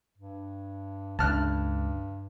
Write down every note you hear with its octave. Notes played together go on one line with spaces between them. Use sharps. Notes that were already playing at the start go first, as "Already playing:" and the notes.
G2
C#2 G2 D3 A5 F6 F#6